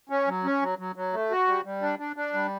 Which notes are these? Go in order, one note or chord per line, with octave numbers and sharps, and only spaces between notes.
C#4
F#3
C#4
F#3
F#3
F#3
A3
F#4
G3
G3
D4
D4
D4
G3